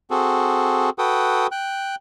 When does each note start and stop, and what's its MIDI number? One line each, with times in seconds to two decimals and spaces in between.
0.11 0.90 60
0.11 0.90 66
0.11 0.90 68
0.11 0.90 69
0.98 1.47 66
0.98 1.47 69
0.98 1.47 71
0.98 1.47 79
0.98 1.47 87
1.52 1.95 79
1.52 1.95 90